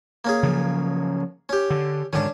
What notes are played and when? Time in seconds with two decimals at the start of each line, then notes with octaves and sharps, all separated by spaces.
0.25 A#3 C#4 G#4
0.43 C#3 F3 F#3
1.49 C#4 G4
1.70 D3
2.13 G#2 D3 D#3 C#4 D4